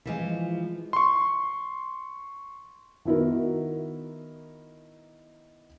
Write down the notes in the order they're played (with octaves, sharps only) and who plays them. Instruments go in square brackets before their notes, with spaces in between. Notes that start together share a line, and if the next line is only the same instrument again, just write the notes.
[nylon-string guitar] E3 F3 G#3
[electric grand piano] C6 C#6
[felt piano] D#3 B3 E4 F#4 A#4